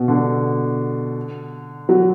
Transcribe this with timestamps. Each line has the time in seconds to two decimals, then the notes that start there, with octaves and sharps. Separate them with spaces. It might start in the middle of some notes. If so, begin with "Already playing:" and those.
Already playing: B2
0.08 D3
1.89 F#3